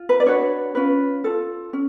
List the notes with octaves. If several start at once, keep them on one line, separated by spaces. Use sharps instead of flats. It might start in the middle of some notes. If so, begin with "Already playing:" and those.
Already playing: F4
B4
D5
D4 F#4 B4 C#5
C#4 F4 B4
F4 A4
C#4